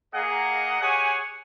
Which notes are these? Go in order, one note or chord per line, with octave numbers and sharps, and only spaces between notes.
A#3 G#4 A#4 D#5 F5 F#5
G4 G#4 C#5 F#5 G#5